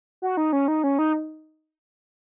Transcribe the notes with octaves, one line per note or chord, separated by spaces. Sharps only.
F#4
D#4
C#4
D#4
C#4
D#4